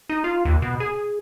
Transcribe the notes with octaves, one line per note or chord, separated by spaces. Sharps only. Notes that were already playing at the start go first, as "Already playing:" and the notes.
D#4
F4
D#2
B2
G#4